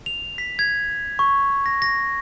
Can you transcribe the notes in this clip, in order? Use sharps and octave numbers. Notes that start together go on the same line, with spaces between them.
F7
B6
G#6
C#6
A#6
A#6